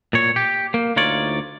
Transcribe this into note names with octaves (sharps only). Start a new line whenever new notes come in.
A#2 C#5
G4
A#3
D2 D#4 F4 C#5 D5